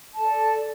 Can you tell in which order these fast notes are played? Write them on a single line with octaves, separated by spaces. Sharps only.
A5 A4 D5